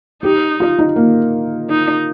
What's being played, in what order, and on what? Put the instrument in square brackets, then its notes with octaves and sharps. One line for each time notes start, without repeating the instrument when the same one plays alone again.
[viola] D#4 [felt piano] G4
[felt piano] F4
D#4
A#3
[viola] D#4